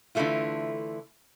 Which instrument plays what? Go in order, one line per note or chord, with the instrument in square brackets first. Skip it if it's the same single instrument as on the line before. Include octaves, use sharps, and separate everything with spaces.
[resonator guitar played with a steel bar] D3 E3 F3 A3 E4 F4